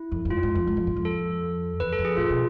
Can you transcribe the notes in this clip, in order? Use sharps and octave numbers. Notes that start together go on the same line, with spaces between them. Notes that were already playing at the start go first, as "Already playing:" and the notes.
Already playing: E4
F2
F2
G#2 F4
G#2
F2
G#2
F2
G#2
F2
A4
E2 B4
A4
F2
G#4
A2 F4
B2